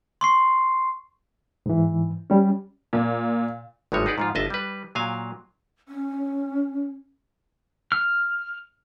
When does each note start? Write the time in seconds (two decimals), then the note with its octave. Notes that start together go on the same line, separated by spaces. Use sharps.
0.21 C6 C#6 C7
1.66 G#2 E3
2.30 G3 C#4
2.93 A#2
3.92 G#1 A2 G3 G#3 C#5
4.06 D#4 G#4 B4 D5 F#5
4.18 G#2 F3 F4
4.35 G1 F4 D#5 E5 A5
4.50 G3 B4
4.95 A#2 F#3 F5 G#5
5.88 C#4
7.92 F6